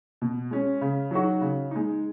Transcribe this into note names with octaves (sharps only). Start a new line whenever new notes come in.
B2
G#3 C#4
C#3
F#3 D#4 F#4
C#3
G#3 D#4